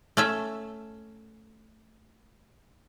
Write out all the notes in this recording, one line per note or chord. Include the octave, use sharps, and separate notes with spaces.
A3 C#4 E5